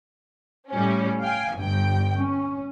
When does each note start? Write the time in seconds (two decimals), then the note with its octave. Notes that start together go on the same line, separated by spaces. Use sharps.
0.71 A2 G3 C#4
1.22 F5 G5 G#5
1.56 G1 G2 G5
2.17 C#4